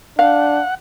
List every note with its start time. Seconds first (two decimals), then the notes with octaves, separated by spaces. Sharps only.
0.19 D4 F5 F#5